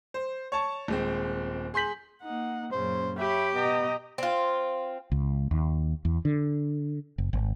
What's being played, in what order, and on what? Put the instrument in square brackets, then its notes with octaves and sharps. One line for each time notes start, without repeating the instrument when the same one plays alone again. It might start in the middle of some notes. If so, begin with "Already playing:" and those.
[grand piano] C5
C#5 A5 C#6
D#1 G#3 C4
G#4 C6 G6 B6 F#7
[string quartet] A#3 D#4 F#5
[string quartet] F#2 A#2 C#3 [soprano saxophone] C5
[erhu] G4 [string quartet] C#5 B5 [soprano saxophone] E5
[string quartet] B2 D#5 A#5 [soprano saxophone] B3
[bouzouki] C4 F4
[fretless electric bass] C#2
D#2
E2
D3
F#1
G#1